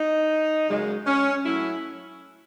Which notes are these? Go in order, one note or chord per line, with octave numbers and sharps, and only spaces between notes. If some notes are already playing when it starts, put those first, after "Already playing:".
Already playing: D#4
F#2 C#3 G#3
C#4
A2 F#3 A3 E4